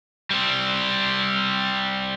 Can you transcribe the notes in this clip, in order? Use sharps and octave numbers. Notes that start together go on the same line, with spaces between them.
G3 C4